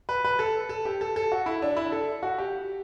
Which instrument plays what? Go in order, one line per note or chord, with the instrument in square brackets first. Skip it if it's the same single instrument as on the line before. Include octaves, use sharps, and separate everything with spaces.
[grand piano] B4
B4
A4
A4
G4
A4
A4
F#4
E4
D4
E4
A4
F#4
G4